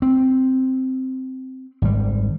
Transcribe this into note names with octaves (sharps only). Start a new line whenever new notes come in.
C4
G#1 G3